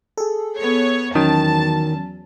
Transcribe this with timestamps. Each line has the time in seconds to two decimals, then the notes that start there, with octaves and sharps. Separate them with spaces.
0.17 G#4 A4
0.59 B3 C#5
1.15 E2 D#3 F#3 C#4 A5